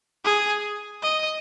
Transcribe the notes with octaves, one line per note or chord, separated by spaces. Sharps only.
G#4
D#5